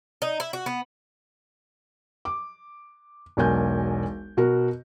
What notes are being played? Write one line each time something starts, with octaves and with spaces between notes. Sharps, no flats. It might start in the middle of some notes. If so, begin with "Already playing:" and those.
D#4
E4
F#4
B3
D6
E1 B1 A#4 G#5 G6
B2 F#4 A#4